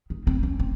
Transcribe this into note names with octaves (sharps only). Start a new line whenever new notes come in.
D#3
C4
C#4
C4